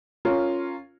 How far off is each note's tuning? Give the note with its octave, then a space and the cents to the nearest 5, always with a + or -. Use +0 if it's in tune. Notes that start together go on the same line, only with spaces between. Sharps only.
C#4 +0 F4 +0 A#4 -10